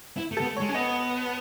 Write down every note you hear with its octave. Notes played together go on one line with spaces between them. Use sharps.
E4
A3
B3 A4
A3
G#3 C#5
C#4
B3 D#5